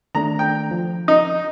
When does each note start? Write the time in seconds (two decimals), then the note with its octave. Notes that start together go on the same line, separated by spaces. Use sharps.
0.15 D#3 A3 D4 A#5
0.39 G5
0.71 F3
1.08 D#4 D#5